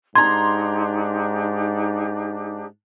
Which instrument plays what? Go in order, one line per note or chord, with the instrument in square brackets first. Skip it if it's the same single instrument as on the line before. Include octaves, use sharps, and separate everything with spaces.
[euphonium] G#2 [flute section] D4 D#4 G4 [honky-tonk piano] A#5 C6 [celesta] G#6